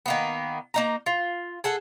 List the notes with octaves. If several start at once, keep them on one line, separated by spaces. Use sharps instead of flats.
D#3 A#3 B3
A#3 D#4 A#5
F4
G#4 A4 F#5